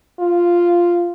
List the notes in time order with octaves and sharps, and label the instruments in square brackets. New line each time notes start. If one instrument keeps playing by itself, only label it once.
[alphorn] F4